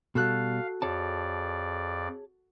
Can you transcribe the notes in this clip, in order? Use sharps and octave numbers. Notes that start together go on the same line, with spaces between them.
B2 G3 F#4 A4 F5 F#6
F2 G#4 C#5 D5 A5